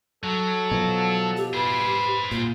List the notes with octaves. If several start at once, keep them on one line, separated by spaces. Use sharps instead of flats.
F#3 A4
B2 F3
G4
G#4 B4 C5
A#2 F4